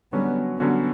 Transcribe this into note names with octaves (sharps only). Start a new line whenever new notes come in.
D3 F#3 G3 B3 C#4 F#4
D3 F#3 G3 B3 C#4 F#4